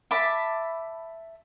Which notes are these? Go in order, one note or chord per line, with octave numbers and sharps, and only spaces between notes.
E5 A5 B5 D6